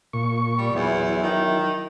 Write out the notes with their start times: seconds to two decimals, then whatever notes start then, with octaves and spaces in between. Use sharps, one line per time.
0.13 A#2 C#6
0.58 G3
0.75 E2 F#3 E4
1.23 D#3